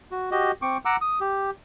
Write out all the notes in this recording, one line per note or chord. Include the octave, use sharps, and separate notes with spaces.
F#4
F#4 G4 D#5
C4 C#6 D6
F#5 A#5 D6 E6
D#6
G4